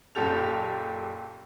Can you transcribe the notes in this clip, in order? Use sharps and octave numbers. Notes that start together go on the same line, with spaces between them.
F#1 A#2 G4 A4 F7